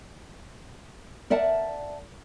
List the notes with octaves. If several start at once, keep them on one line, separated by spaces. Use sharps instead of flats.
A#4 D5 E5 F#5 A5